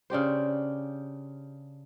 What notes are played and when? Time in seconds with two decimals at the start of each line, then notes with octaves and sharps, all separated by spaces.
0.10 C#3 D4 G4 C5